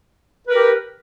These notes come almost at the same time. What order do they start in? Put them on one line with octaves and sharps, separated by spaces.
B4 A#4 G4